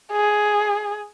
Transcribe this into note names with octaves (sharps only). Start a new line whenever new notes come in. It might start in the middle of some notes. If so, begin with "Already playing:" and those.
G#4